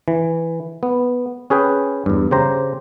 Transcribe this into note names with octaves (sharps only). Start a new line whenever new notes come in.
E3
B3
C#4 G#4 B4 G5
E2 G2
C#3 G4 C5 A#5